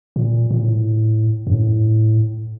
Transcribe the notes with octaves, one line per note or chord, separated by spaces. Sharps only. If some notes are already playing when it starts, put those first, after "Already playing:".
A#2
A#2
A2
F#2
A2